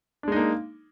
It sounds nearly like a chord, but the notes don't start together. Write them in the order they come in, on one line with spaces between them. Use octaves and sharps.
D4 G#3 D#4 A#3